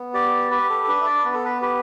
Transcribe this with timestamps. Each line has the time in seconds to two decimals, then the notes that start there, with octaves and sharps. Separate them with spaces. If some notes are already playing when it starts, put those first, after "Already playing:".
Already playing: B3
0.14 G4 D5
0.51 G4 B4
0.70 A4
0.84 A4
0.88 D4 B4
1.02 E5
1.06 D5
1.25 B3 B4
1.34 A4
1.45 B4
1.62 G4 B4